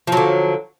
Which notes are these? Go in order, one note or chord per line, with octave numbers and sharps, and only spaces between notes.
D3 F3 F#3